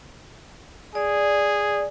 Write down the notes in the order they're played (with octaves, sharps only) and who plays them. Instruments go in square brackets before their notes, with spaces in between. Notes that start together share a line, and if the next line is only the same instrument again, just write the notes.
[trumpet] G#4 [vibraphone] D5